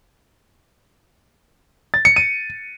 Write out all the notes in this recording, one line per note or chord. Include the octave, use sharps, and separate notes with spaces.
A6
C#7
D#7